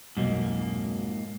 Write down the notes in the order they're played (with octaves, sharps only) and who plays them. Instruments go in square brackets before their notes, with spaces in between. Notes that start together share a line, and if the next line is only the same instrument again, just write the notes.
[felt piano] B1 F2 D#5 [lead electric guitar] G#2 A#3